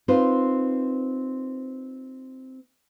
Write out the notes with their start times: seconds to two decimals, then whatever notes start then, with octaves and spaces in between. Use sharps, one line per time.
0.08 C4 D#4 F4 B4 C5